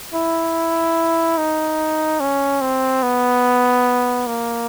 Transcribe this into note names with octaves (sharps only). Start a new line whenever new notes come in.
E4
D#4
C#4
C4
B3
A#3